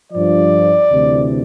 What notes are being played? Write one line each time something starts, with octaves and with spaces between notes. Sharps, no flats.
G2 F3 D5
D2 C3 E3